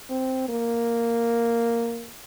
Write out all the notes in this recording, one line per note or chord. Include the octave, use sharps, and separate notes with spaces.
C4
A#3